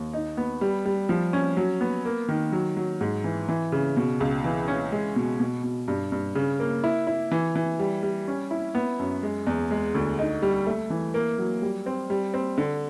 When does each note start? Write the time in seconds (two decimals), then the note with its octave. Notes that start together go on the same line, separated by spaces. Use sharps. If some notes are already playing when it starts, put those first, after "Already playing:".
Already playing: D#2
0.13 D#4
0.37 B3
0.61 G3
0.85 G3
1.09 F3
1.33 C#4
1.57 F#3
1.81 B3
2.05 A#3
2.28 D#3
2.52 F#3
2.77 F#3
3.01 G#2
3.24 E3
3.49 E3
3.72 C#3
3.97 B2
4.20 C#2
4.44 E3
4.68 C#4
4.92 G#3
5.16 B2
5.40 B2
5.63 B2
5.88 G2
6.12 G2
6.35 C#3
6.60 A#3
6.84 E4
7.07 E4
7.32 E3
7.55 E3
7.79 G3
8.03 G3
8.28 C#4
8.51 E4
8.75 B3
8.99 F#2
9.23 G#3
9.47 E2
9.71 G#3
9.95 D2
10.19 D#4
10.42 G3
10.66 A3
10.90 E3
11.14 A#3
11.38 F#3
11.62 G3
11.86 C4
12.10 G3
12.34 C4
12.58 D3